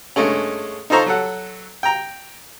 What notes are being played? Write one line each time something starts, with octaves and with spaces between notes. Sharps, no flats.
G2 G#3 A3 C#4
D#4 F4 A4 C5 A#5 C#6
F#3 A4 F#5
G5 A#5